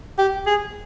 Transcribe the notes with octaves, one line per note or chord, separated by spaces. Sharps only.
G4
G#4